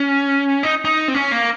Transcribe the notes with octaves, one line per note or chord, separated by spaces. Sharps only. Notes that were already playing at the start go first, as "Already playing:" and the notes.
Already playing: C#4
D#4
D#4
C4
C#4
A#3